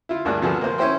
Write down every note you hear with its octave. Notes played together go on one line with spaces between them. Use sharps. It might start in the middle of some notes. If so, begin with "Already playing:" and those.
E4 F4
D2 G2 A#3 D4 G#4 F#6
C3 F3 B3 F#4 G#4 A4
A#3 C5
C#4 E4 C5 G5 C6